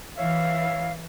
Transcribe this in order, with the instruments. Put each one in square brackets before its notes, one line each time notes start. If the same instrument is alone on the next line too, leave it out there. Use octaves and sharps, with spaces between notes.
[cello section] E3 [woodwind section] C#5 E5 F5